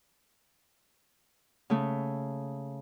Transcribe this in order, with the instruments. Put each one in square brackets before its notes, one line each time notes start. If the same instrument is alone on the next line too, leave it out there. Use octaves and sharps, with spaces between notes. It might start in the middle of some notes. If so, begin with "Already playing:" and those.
[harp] C#3 A3